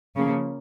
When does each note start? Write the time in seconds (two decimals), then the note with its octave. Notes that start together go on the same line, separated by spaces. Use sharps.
0.16 C#3 F3 A#3